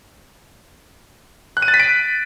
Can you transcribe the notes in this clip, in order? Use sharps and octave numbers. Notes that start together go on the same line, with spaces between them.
F#6
D#7
A6
B6
D7